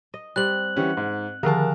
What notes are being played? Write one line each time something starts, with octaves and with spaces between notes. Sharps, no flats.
D#5
G3 C4 G4 F#6 F#7
E3 G3 C#4 F#5
G#2
D3 D#3 F3 A#4 A5